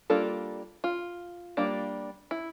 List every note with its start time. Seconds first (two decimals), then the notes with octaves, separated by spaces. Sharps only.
0.10 G3 A#3 D4 F4 A4
0.84 F4
1.57 G3 A#3 D4
2.31 E4